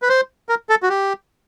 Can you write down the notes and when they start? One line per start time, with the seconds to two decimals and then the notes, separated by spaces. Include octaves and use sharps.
0.02 B4
0.09 C5
0.49 A#4
0.69 A4
0.83 F#4
0.89 G4